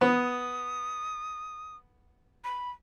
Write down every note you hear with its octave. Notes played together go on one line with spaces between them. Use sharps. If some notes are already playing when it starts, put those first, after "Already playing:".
B3 D#6
B5